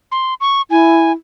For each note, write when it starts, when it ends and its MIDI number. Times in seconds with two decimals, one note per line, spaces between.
0.12 0.34 84
0.41 0.62 85
0.71 1.11 64
0.71 1.12 80